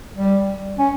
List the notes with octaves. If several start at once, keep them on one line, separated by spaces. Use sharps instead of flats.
G3
C#4